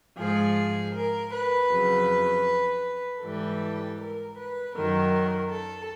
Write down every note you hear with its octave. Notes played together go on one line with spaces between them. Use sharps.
G#2 F3 G#4
A#4
B4
F2 C#3 F#3
G#2 E3 G3 A4
A#4
B4
F#2 D#3 F#3 A#4
A4